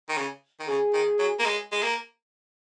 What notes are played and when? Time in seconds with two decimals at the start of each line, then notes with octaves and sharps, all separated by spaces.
0.09 D#3
0.18 C#3
0.60 D#3
0.68 C#3 G#4
0.94 D#3
1.19 F#3
1.40 A#3
1.45 G#3
1.72 G#3
1.83 A#3